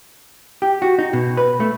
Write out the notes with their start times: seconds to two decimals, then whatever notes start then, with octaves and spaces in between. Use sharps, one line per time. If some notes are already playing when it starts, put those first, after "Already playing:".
0.62 G4
0.82 F#4
0.98 D#4
1.13 B2
1.37 B4
1.60 A3